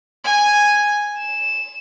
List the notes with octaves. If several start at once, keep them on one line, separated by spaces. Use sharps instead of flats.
G#5
E7